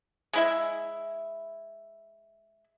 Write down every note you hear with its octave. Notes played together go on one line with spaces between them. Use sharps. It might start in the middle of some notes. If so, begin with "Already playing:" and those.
G#3 E4 E5